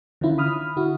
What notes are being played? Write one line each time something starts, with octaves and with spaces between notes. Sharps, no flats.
D3 D#3 C#4 E4 F4
B5 D#6 F6
D3 E4 F#4